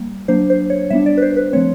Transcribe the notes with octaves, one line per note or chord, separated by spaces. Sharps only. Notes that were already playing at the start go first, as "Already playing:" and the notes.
Already playing: G3 A#3
F#3 A#3 D4 C5
C5
C#5
G3 B3 D4 E5
D5
B4
C5
B4
F3 A3 C4 C#5